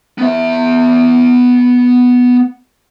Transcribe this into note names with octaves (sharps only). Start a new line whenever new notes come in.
B3 E5